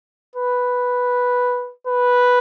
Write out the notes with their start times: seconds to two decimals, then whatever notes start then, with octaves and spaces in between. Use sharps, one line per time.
0.36 B4
1.87 B4